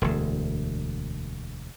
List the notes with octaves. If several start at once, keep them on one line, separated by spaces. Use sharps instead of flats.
E1 D2